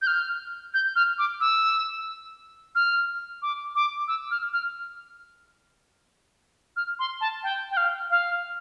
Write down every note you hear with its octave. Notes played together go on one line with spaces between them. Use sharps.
G6
F6
G6
F6
D6
E6
F6
D6
D6
E6
F6
F6
F6
C6
A5
G5
G5
F5
F5